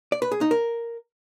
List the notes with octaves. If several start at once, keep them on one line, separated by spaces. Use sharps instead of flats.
D5
B4
G#4
D#4
A#4